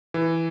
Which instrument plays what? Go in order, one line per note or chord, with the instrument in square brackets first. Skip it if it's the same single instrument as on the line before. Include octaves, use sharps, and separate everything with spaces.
[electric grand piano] E3